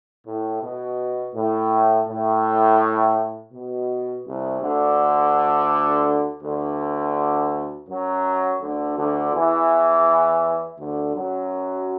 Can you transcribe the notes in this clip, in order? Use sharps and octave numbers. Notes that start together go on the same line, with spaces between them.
A2
B2
A2
A2
B2
C2 C3
D2 D3
D2 D3
F#2 F#3
D2 D3
D2 D3
E2 E3
D2 D3
F#2 F#3